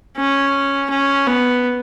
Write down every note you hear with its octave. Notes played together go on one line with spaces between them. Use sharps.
C#4
C#4
B3